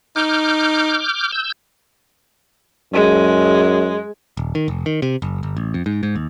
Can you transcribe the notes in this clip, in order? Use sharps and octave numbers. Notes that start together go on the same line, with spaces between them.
D#4 D6 F6 G6
E6 G6
F#2 G#3
D#1
D#3
F1
D#3
C3
F#1
G1
A1
F2
G#2
G#2
D#2